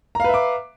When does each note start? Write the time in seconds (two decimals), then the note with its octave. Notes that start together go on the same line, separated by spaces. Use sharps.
0.15 A#5
0.20 F5
0.24 B4
0.29 E5
0.34 D6